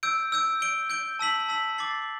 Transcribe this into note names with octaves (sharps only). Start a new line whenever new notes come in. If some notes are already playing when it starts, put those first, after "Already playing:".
E6 G6 D7
E6 G6 D7
G6 D7 G7
G6 D7 G7
A5 E6 B6 F#7
A5 E6 B6 F#7
D6 A6 C7 F#7